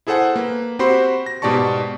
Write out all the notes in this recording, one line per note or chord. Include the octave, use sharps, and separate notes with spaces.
E4 G#4 A4 C5 F#5 G#5
A#3 B4
C4 F#4 G4 C5 B5 C6
A#6
G#2 B2 G4 D5 A5 C#6